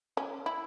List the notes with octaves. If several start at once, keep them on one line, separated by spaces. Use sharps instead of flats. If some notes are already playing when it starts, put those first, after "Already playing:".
C#4
E4